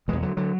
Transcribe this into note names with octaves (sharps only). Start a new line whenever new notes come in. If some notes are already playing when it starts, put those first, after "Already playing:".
E2 B2 E3 G#3
D3 F#3
D3 F#3